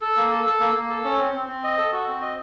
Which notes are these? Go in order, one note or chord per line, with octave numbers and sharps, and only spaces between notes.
A4
A#3
A4
A4
A#3
A#3
A4
C#4
C4
C4
C4
D#5
A4
F#4
C4
D#5